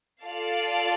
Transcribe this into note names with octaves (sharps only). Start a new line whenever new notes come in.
F4 A4 D5 F5 A5